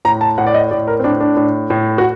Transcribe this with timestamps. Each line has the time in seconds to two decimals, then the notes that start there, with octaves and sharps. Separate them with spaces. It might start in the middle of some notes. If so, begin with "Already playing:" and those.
0.05 A2 A#5
0.21 A5
0.38 A2 F#5
0.47 D5
0.54 D#5
0.71 A2 D5
0.87 A#4
1.00 C4
1.04 A2 D4
1.20 D4
1.37 A2
1.70 A2
1.98 F#4